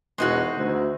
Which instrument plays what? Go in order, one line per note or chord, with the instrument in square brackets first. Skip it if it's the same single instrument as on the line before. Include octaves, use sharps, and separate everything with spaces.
[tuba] E1 [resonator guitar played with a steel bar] G#3 D#4 F#4
[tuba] D2